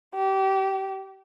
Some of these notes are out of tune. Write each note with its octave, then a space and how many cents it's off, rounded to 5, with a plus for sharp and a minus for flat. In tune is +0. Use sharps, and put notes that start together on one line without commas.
G4 -25